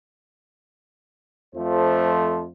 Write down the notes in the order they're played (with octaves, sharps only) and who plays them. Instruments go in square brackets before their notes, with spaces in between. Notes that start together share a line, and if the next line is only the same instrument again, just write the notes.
[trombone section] F2 F3 A3 C5